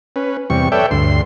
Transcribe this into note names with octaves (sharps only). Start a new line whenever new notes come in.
C#4 B4
E2 C3 G3 C#6
A4 B4 C#5 D5 E5 G5
D2 G2 C6